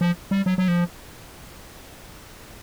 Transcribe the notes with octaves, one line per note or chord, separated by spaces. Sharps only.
F3
G3
F#3
F#3
F3